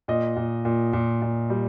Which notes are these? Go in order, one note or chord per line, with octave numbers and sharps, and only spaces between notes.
A#2 D#5
A#2
A#2
A#2
A#2
G3